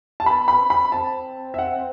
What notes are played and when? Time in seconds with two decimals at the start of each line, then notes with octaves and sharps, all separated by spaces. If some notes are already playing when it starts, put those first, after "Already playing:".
0.20 A5
0.26 B3 B5
0.48 B5
0.59 C4
0.70 B5
0.92 C4 A5
1.54 E5
1.58 F#5